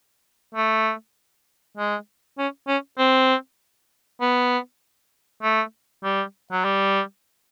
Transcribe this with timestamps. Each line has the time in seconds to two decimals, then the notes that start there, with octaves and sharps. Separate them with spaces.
0.55 A3
1.77 G#3
2.38 C#4
2.68 C#4
2.98 C4
4.21 B3
5.43 A3
6.04 G3
6.52 F#3
6.64 G3